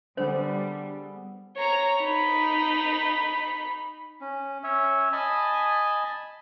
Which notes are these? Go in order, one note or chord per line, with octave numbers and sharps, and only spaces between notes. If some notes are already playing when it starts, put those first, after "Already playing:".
D3 G3 B3 G#4 A4 C5
C#5 A#5
D#4 B5
C#4
C#4 C#5 E5
D#5 G#5 A5 B5